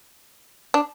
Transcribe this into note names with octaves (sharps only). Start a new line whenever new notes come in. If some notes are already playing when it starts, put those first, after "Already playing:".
D4